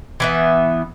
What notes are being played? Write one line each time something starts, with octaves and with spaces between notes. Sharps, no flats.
E3 B3 E5